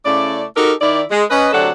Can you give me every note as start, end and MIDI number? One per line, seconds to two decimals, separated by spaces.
0.05 0.43 49
0.05 0.43 57
0.05 0.43 64
0.05 0.43 74
0.56 0.72 63
0.56 0.72 66
0.56 0.72 67
0.56 0.72 69
0.56 0.72 70
0.81 1.01 51
0.81 1.01 64
0.81 1.01 74
1.11 1.23 56
1.30 1.48 61
1.30 1.48 71
1.30 1.48 75
1.53 1.70 38
1.53 1.70 48
1.53 1.70 54
1.53 1.70 62
1.53 1.70 69
1.53 1.70 78